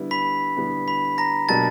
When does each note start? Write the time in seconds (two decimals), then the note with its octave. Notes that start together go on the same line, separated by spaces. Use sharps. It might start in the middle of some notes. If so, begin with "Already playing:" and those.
Already playing: D3 G3 B3 E4
0.11 B5 B6
0.57 D3 G3 B3 E4
0.88 B5 B6
1.18 A#5 A#6
1.49 B2 F#3 A#3 D4 G4 A5 A6